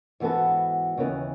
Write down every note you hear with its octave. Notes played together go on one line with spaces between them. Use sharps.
G#2 E3 B3 F#4 A4
D#2 C#3 E3 B3